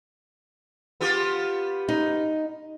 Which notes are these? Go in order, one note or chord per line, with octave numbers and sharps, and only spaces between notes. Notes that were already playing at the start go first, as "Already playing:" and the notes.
B3 F4 G4
D#4